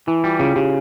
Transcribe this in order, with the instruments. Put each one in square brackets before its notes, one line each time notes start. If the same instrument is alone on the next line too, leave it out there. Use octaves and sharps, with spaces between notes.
[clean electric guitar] E3 [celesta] E4
[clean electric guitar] G3 [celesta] F4
[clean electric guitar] C#3 [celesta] F4
[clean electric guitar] C#3 [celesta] G4